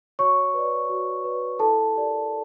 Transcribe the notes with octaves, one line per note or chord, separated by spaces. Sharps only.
F#4 C#5 C#6
B4 D5
F#4
B4 D5
E4 A4 A5
G4 A#4 D5